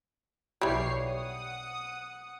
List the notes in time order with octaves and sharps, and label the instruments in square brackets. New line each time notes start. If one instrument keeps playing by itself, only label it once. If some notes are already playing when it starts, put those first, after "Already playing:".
[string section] B1 C#5 C7 [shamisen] E3 G3
[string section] F#5 D#6